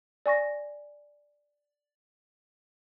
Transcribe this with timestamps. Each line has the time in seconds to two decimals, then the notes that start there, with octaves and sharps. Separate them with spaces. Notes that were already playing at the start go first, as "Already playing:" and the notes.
0.26 D5 G#5 C#6 A#6